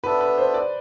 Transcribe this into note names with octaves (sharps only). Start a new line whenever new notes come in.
B3 D4 A4 B4 E5
B4
C5
D5